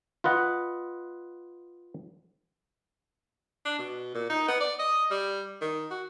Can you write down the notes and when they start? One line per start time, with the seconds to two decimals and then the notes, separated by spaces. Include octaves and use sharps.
0.24 F4 B4 D#5 F#5
3.65 D4
3.79 B2
4.15 A#2
4.30 D#4
4.48 B3
4.60 D5
4.79 D#5
5.11 G3
5.62 D#3
5.91 F#4